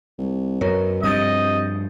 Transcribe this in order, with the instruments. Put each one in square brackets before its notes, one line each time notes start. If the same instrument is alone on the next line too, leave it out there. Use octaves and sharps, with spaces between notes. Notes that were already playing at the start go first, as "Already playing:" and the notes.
[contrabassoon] C2
[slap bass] F#2 [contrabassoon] B2 [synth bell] A#4 C#5
[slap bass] G2 F3 [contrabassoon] C3 [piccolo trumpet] D#5 [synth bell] D#6 G6 A6